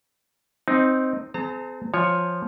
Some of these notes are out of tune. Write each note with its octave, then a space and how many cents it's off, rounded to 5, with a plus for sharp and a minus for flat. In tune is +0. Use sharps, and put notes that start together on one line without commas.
C4 +0 D#4 +0
C4 -35 G#4 +35 A#5 -40
F3 +0 C#5 +0 G#5 -15